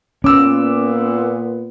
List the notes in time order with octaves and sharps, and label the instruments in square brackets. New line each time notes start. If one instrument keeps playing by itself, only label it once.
[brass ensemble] A#2 B3 [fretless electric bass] C#4 [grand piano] D6 E6